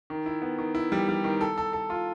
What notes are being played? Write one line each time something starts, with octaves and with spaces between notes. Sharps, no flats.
D#3
E4
B3
D#3
E4
G3
G3
D#3
A4
A4
A4
F4